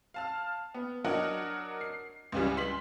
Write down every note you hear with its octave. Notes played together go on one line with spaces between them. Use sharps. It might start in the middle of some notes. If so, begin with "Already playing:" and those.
F5 A5 F6
B3
F#3 D4 F#4 A#4 D#5 F#5
C7
C#2 C#3 E3 G3
C6 B6 F#7